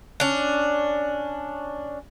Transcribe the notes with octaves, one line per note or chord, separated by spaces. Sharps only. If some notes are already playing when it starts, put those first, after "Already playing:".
C#4 D4